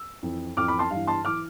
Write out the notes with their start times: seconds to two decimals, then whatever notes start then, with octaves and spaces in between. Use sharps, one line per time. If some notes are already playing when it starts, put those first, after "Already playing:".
Already playing: E6
0.23 F2 E3
0.57 F2 E3 D6 F6
0.68 B5 D6
0.79 A5 C6
0.91 G2 E3 F5
1.07 A5 C6
1.25 E3 D6 F6